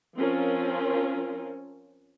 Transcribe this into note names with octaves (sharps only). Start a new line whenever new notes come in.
F3 C4 C#4 F4 A#4